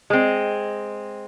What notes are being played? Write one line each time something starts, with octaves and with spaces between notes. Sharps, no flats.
G#3 C4